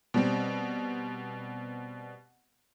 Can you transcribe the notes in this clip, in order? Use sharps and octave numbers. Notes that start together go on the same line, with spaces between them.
B2 G3 C4